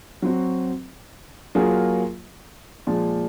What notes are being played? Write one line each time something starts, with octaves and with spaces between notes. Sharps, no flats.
F#3 C4 F#4
F#3 A#3 F4 G#4
A#2 F3 G#3